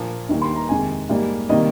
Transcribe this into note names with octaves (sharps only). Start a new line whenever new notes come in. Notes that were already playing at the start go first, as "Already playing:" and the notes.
Already playing: A#2 F3 A#3
D#2 D#3 G3 A#3
C6
A#5
F2 C3 D#3 G#3 G#5
G#2 G3 A#3
C3 D#3 G3 A#3 D#5